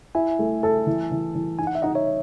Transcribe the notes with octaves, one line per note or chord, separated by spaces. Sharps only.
E4 E5 G#5
A3
A4
E3
E3
E3
D#4 G#5
F#5
E5
D#4 D#5 F#5
C#5 E5